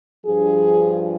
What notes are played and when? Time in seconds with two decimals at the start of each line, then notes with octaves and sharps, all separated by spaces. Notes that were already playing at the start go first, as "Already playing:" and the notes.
0.25 G2 F3 G#4